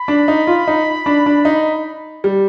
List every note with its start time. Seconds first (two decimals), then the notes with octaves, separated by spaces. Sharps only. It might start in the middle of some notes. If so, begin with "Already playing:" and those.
Already playing: B5
0.08 D4
0.28 D#4
0.47 F4
0.68 D#4
1.06 D4
1.26 D4
1.45 D#4
2.24 G3